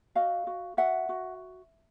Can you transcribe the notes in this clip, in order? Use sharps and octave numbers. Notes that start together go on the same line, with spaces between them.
F#4 D#5 F5
F#4
F#4 E5 F#5
F#4